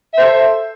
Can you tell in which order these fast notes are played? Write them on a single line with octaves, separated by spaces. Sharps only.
E5 C5 A4